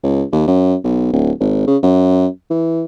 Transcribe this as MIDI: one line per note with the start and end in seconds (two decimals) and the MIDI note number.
0.03 0.23 37
0.32 0.44 39
0.47 0.75 42
0.84 1.10 35
1.13 1.31 26
1.40 1.64 32
1.67 1.77 49
1.83 2.27 42
2.50 2.85 52